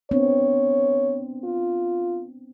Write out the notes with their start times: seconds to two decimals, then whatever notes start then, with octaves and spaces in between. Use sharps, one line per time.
0.11 B3 C4 D4 C#5
1.44 F4